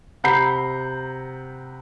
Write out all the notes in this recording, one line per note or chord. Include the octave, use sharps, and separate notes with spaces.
C3 F#5 A#5 B5 G6 C7